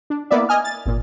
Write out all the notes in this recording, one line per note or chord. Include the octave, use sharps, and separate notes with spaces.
D4
A#3 B3 E4 D5 E5
D#5 G#5 F6
A6
G#1 A#2